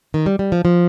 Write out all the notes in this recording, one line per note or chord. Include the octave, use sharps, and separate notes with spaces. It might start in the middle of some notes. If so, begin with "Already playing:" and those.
D#3
G3
G3
F3
F3